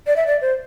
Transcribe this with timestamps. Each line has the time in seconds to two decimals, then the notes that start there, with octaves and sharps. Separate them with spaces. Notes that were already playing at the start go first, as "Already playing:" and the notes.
0.07 D5
0.16 E5
0.27 D5
0.41 C5